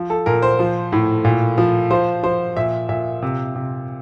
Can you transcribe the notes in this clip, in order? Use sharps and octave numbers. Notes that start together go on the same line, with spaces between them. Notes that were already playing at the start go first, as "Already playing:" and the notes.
Already playing: F3
A4
A#2 A#4
C5
F3
A2
A#2
F3
F3 C5
F3 C5
A#2 E5
A#2 E5
C3
C3